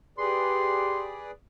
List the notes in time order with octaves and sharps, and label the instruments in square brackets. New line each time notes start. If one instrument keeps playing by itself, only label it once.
[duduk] G4 [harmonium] G#4 B4 D5 [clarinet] C6